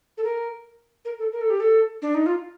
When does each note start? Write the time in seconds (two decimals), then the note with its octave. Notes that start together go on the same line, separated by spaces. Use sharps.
0.18 A4
0.24 A#4
1.05 A#4
1.19 A4
1.32 A#4
1.41 A4
1.50 G4
1.60 A4
2.02 D4
2.15 D#4
2.26 F4